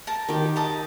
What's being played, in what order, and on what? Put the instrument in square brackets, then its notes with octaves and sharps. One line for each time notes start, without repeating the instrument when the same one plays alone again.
[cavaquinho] A#4 A5
[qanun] D#3 G4
[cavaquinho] D#5 A5 A#5